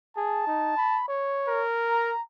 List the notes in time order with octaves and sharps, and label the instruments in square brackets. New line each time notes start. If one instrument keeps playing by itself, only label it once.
[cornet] G#4 [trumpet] A5
[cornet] D#4
B5
C#5
[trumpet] A#4
[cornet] A#5